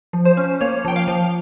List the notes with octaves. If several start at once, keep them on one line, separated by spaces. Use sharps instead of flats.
F3
C5
C#4
A#3 C#5
F3 G5
F5
F3